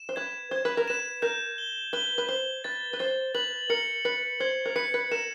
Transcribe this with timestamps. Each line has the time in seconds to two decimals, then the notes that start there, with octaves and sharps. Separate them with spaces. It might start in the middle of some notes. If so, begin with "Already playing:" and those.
Already playing: E7
0.09 C5
0.16 B4 G#6
0.51 C5 G#6
0.65 B4
0.77 A#4
0.88 B4 E7
1.22 A#4 G6
1.58 G7
1.93 B4 G7
2.18 B4
2.29 C5 G7
2.64 B4 A6
2.93 B4
2.99 C5 A6
3.34 B4 F#7
3.70 A#4 C#7
4.05 B4 C#7
4.40 C5 G#6
4.65 A#4
4.76 B4 C#7
4.94 B4
5.11 A#4 E7